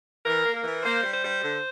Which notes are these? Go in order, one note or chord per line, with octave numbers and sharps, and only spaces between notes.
E3 A#4
A#3
A#4
E3
A#3 C5
G3
C5
G3
D3